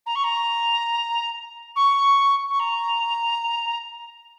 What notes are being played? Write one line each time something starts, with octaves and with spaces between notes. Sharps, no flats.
A#5
C#6
A#5
C#6
C#6
A#5